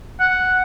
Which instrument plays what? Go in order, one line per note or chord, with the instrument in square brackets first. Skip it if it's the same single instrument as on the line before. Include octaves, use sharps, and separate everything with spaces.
[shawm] F#5